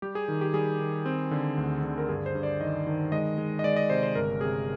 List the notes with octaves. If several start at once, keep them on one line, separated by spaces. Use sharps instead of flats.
G3 G4
G#4
D#3
G4
G3 G#4
D#3
C4
D3
D2
D3
A#4
G2 G#4
C5
G2
D5
D#3 D#5
D#3
G#3 D#5
G#3
D#5
G#3 D5
D#5
C3 C5
C5
G1 A#4
C3 G#4